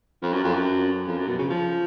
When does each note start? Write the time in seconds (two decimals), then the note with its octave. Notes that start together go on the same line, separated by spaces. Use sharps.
0.22 F2
0.33 F#2
0.44 F2
0.54 F#2
1.07 F2
1.18 F#2
1.28 B2
1.39 C#3
1.50 F3